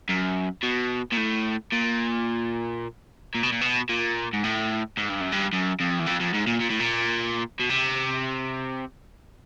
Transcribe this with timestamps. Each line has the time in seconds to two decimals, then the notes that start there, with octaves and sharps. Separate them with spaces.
0.09 F#2
0.63 B2
1.12 A#2
1.17 A2
1.72 A#2
3.35 A#2
3.43 B2
3.52 A#2
3.61 B2
3.90 A#2
4.33 G#2
4.44 A2
4.97 G#2
5.09 G2
5.20 F#2
5.32 G2
5.53 F#2
5.80 F2
5.99 E2
6.06 F2
6.20 F2
6.34 G#2
6.47 A#2
6.61 A#2
6.70 A2
6.80 A#2
7.59 B2
7.70 C3